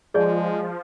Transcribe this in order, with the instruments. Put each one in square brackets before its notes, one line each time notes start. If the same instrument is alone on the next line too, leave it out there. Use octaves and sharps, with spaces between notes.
[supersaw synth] F3 [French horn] G#3 [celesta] G#4 [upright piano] D5 G6